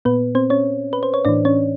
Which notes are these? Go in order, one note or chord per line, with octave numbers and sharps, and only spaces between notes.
A#2 B3 B4
C4 C5
C#4 C#5
B4
C5
C#5
A2 E3 D4 D5
C#4 C#5